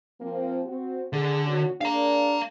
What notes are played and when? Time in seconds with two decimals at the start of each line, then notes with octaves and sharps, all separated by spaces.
0.20 F3 A#3 C4
0.66 C4 F#4
1.13 D3 G#4
1.46 A#2 C#4 F#4
1.81 A#3 D4 G#4 F5 A#5